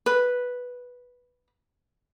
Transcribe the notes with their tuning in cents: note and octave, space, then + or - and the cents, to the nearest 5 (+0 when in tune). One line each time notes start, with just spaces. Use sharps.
B4 -5